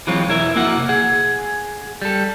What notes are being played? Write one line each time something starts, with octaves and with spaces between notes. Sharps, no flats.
E3 F#3 G#3 C4 F4 C#5
B1 E2 E4 A#4 E5
F2 A#3 E4 F#4 F#5
C3
G#4 F#5
G3 A4